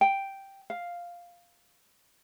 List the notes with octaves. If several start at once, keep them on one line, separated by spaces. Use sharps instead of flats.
G5
F5